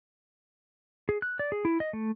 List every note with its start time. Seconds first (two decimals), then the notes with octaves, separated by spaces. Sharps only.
1.09 G#4
1.22 F#6
1.39 D5
1.52 G#4
1.65 E4
1.80 D#5
1.93 A3